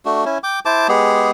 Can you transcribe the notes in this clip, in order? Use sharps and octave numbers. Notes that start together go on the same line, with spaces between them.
A3 D4 F#4
C#4 E4
G5 D6
E4 C5 A5 D6
G#3 B3 G4 G#4